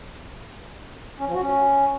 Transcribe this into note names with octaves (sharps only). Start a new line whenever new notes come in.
C#4
F3
F#4
C#4